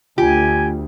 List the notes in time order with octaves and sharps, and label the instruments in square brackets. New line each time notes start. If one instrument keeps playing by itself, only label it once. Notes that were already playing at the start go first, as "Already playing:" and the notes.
[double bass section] D2 [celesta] F4 [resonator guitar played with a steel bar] G4 [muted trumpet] G#5